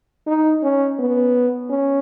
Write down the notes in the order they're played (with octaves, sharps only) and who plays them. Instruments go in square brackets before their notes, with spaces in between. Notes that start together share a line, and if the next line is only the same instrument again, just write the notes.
[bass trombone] D#4
C#4
B3
C#4